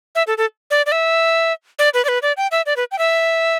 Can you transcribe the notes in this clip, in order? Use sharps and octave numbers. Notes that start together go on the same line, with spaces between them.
E5
A4
A4
D5
D5
E5
D5
B4
D5
B4
D5
G5
E5
D5
B4
G5
E5